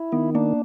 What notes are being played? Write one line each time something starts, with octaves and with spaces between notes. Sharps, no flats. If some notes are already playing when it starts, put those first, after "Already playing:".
Already playing: E4
D#3 B3
A#3 D4